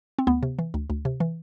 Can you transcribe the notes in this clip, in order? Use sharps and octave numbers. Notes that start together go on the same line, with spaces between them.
C4
D2 B3
C3
E3
D2
D2
C3
E3